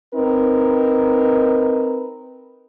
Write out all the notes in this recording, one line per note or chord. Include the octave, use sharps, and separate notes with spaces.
C4 D#4 A#4 B4